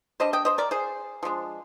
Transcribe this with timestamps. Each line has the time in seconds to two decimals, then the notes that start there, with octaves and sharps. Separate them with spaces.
0.20 G3 D4 C5 D#5
0.33 D#5 G5
0.45 C5 D#5
0.58 A#4 D5
0.71 G#4 C5
1.23 F3 G#3 D4